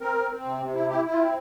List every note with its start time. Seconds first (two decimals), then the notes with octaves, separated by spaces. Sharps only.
0.01 C4 A#4
0.15 C4
0.30 C4
0.45 C3
0.60 C3
0.75 E4
0.89 E4 G4
1.05 E4
1.12 F4
1.19 C4